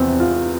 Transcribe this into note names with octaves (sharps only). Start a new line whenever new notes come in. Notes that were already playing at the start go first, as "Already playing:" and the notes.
Already playing: E2 C3 F3 B3 C4
F4